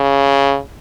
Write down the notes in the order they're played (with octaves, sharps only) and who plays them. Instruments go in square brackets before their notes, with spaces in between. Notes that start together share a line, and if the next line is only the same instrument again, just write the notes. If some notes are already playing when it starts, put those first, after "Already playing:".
Already playing: [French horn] C#3